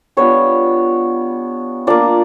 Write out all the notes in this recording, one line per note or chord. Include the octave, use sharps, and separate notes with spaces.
G3 B3 D4 F4 C#5
A#3 D4 F4 D5